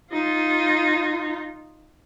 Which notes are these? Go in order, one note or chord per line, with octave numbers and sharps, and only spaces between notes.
D#4 F4